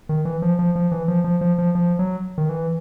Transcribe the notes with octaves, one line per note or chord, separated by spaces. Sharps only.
D#3
E3
F3
F3
F3
E3
F3
F3
F3
F3
F3
F#3
D#3
E3